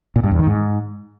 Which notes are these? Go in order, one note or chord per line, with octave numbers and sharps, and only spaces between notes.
A#2
G2
E2
D#3
G#2